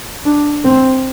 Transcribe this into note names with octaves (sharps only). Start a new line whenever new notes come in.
D4
C4